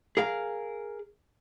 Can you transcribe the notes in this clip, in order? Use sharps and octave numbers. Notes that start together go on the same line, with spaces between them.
G#4 A#4 F5